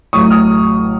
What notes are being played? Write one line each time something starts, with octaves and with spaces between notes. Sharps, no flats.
A1 A2 F#3 C#6 D#6
D#6 F6